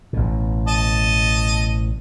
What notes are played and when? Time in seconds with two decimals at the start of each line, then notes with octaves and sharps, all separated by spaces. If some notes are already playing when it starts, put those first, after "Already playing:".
0.13 A1 B2
0.68 D#5 A5